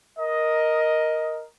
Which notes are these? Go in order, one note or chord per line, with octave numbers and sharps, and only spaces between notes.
A#4 D#5